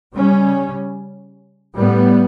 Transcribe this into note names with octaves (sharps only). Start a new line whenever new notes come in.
C#3 G3 C#4
A2 G3 B3